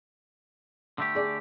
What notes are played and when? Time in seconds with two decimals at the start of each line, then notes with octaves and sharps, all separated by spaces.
0.98 D3 A3 G4
1.15 G#4 D5